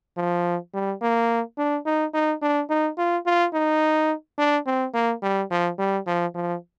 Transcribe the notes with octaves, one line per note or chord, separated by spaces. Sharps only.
F3
G3
A#3
D4
D#4
D#4
D4
D#4
F4
F4
D#4
D4
C4
A#3
G3
F3
G3
F3
F3